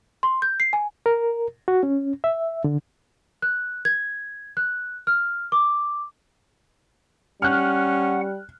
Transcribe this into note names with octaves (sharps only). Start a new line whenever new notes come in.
C6
G6
C7
G#5
A#4
F#4
C#4
E5
D3
F#6
G#6
F#6
F6
D6
G3 C#4 F#5 F6 F#6